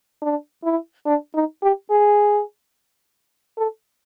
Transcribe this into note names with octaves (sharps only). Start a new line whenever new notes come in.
D4
E4
D4
D#4
G4
G#4
A4